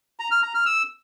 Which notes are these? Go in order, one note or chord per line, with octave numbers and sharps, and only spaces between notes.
A#5
F6
A#5
F6
E6